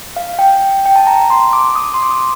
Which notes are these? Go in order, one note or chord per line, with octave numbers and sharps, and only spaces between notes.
F5
G5
G5
A5
A#5
C6
D6
D#6
C6
D6
D#6